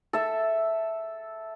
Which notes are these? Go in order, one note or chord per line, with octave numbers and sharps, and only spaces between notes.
A4 E5